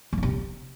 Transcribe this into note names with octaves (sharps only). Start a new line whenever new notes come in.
E3
D3
C3